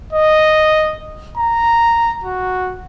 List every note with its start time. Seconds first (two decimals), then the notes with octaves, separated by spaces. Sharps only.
0.13 D#5
1.38 A#5
2.24 F#4